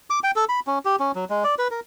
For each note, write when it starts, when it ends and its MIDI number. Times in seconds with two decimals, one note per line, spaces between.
0.10 0.19 86
0.24 0.31 79
0.36 0.45 69
0.49 0.60 83
0.67 0.79 61
0.85 0.96 67
1.00 1.12 61
1.15 1.25 54
1.30 1.44 56
1.44 1.55 74
1.59 1.68 71
1.71 1.80 70